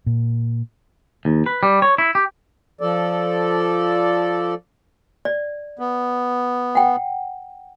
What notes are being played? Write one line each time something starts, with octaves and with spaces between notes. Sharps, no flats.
A#2
D#2
B4
G3
C#5
E4
G4
F3 A4 D5
D5
B3
F#5 G5